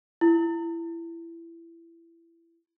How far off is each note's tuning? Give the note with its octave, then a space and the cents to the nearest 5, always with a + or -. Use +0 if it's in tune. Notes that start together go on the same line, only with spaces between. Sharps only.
E4 +20